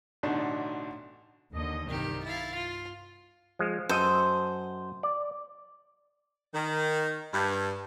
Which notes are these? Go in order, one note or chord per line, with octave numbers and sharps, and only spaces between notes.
A1 B2 D3 D4 D#4
D#2 D3 D#5
C2 G2 D#3 G4
E4 F5 A6
F4
F3 G#3
F#2 A4 C5 D#5
D5
D#3
G2